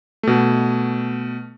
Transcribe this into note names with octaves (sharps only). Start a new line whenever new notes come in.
B2 A3